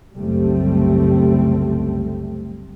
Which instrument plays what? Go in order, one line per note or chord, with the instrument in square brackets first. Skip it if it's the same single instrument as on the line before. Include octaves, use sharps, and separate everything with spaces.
[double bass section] F#1 C2 G3 A3 C4